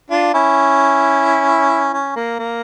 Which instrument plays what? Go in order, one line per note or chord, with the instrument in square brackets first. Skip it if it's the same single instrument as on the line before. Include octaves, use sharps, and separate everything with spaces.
[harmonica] D4 F4
C#4 E4
C#4
A#3
A#3